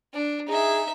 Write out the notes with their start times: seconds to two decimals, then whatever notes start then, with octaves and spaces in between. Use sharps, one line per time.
0.14 D4
0.48 D#4 G#4 E5